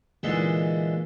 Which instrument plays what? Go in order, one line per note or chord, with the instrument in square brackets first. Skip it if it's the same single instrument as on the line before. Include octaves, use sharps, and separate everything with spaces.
[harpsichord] A#2 D3 E3 G#3 D#4 G#4